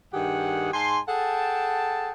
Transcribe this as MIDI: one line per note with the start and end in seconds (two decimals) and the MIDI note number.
0.13 0.71 43
0.13 0.71 51
0.13 0.71 67
0.13 0.71 68
0.13 0.71 78
0.73 0.99 44
0.73 0.99 80
0.73 0.99 81
0.73 0.99 84
1.08 2.13 68
1.08 2.13 69
1.08 2.13 78
1.08 2.13 79
1.08 2.13 81